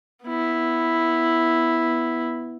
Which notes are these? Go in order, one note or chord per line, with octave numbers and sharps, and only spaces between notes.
B3 E4